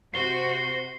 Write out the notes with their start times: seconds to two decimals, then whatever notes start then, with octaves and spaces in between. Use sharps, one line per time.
0.14 C3 F#4 C5 C7 G7